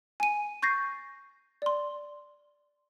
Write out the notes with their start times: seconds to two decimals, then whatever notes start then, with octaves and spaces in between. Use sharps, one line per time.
0.20 G#5 D#7
0.62 C#6 G6 A6 A#6 C7
1.62 D5 C6